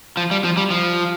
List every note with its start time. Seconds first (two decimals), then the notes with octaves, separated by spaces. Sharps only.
0.17 F3
0.31 G3
0.44 F3
0.57 G3
0.70 F3